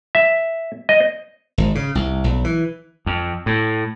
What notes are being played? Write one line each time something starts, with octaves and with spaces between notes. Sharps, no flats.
E5
D#5
G#1
C#3
C2
B1
E3
F2
A2